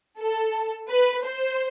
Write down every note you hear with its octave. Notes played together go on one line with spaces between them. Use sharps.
A4
B4
C5